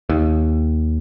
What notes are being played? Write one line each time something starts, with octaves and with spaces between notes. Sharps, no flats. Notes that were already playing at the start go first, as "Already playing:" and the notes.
D#2